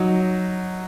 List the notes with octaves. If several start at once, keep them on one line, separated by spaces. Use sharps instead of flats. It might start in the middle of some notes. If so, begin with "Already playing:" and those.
Already playing: F#3 D#4